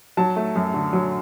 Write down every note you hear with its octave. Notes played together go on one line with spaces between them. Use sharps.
F#3 A5
A3
F#2
D3
F#3